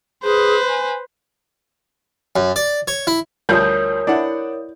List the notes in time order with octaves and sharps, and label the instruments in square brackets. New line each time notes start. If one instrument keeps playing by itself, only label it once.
[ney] G#4 [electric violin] B4 C5
[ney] G#5
[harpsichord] F#2
D5
C#5
E4
[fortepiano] D2 F3 G3 [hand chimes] A#4 C#5 D#6 [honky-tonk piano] G6
[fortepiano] D4 F#5 [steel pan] E4 D5